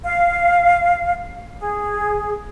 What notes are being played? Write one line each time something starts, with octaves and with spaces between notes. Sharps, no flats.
F5
G#4